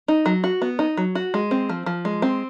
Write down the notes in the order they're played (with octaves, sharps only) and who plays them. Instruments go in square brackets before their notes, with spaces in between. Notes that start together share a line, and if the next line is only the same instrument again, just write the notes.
[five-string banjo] D#4
F#3
F#4
B3
D#4
F#3
F#4
G#3
C4
F3
F3
G#3
C4